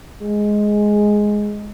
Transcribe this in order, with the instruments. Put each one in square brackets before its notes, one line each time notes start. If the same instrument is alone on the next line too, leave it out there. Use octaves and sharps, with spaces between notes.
[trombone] G#3